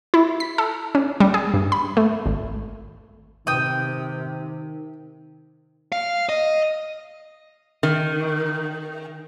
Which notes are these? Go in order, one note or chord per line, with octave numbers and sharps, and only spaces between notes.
E4
B6
A4
C#4
G3
G#4
G2
B5
A3
G#1
C3 D#3 G5 D#6
F5
D#5
D#3